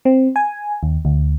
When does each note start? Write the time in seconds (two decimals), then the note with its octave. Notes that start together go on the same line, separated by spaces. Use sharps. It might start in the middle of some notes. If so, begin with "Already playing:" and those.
0.05 C4
0.36 G#5
0.83 D#2
1.05 D2